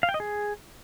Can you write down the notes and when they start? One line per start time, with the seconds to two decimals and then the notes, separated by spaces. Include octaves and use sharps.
0.03 F5
0.09 G5
0.14 D#5
0.20 G#4